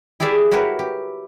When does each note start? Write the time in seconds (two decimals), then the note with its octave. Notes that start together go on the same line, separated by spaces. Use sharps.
0.20 E4 G4 G#4 D5 E5 F5
0.51 E4 F#4 G4 A#4 B4 C#5
0.79 G4